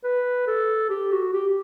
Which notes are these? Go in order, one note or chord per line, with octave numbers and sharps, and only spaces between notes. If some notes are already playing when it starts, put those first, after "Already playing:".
B4
A4
G4
F#4
G4